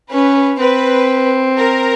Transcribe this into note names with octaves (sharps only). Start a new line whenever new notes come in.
C#4 B4
C4 B4
A#4